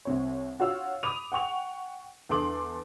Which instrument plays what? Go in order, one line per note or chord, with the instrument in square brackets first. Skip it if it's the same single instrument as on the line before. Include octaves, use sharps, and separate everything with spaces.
[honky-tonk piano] C2 C4 C#5
F4 F#4 C#5 F5 E6
B5 D6 D#6 D#7 F7
F#5 G5 C#6 F7
E2 D3 A4 C6 D6 F#7